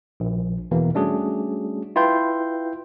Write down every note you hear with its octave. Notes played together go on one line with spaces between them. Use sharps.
A#1
E2 B2 E3 A#3
G3 A3 C#4 D4 F#4 G#4
E4 F4 B4 G5 C6 G6